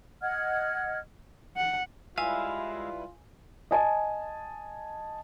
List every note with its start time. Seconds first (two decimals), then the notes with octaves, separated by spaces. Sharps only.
0.22 D#5 F#5 F6 G#6
1.57 F#5
2.18 G3 G#3 E4 F4 B4 E5 F5 G#5
3.71 D#5 G#5 A5